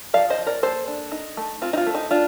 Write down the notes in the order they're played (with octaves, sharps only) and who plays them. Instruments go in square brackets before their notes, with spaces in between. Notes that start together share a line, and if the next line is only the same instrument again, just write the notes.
[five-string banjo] F3 D5 F5
C5 D#5
F3
A#4 D5
A#3 A4 C5
D4
D#4
A3
C4 F4
D#4
F4
A3
D#4
D4 F4